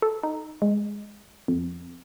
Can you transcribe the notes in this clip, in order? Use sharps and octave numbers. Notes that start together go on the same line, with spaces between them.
A4
D#4
G#3
F2